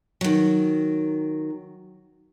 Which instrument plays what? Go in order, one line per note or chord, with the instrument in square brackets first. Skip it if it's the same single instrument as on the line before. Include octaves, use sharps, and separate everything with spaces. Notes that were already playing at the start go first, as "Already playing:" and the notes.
[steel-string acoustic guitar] D#3 F#3